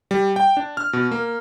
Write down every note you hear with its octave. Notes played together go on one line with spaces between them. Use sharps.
G3
G5
D4
F6
B2
A#3